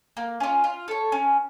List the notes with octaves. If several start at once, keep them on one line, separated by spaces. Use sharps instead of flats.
A#3
C#4 F4
F4
A4 C#5
C#4